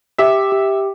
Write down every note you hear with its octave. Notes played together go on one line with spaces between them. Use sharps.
G4 E5
G4